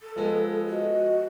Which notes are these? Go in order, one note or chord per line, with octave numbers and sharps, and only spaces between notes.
A4
F3 G#3 B3
F#4 D#5